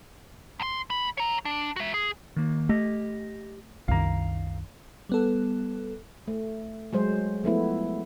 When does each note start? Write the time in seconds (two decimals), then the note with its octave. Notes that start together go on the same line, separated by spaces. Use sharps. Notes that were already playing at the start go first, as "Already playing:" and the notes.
0.60 E2 C6
0.90 G#2 B5
1.18 C#5 A#5
1.45 D4
1.76 F#4 E5
1.94 G#4
2.36 D#3 A#3
2.69 A3 G4 D#5
3.88 C2 F#2 D#3 F5 A#5
5.09 G3 B3 A4
6.28 A3
6.93 F#3 G#3 C5
7.44 F3 A3 B3 E4